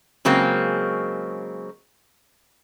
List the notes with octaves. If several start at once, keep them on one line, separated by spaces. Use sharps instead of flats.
C#3 F#3 G#3 A#3 C4